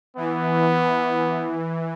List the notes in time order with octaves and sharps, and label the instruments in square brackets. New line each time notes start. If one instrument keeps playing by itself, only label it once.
[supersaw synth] E3 [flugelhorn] B3